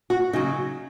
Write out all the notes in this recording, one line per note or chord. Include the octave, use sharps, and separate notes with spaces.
F#4
C#3 F#3 D#4